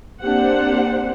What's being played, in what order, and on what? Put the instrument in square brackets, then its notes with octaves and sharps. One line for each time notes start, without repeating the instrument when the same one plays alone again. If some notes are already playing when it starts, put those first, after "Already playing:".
[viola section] A#3 C4 D4 G4 C5 F#5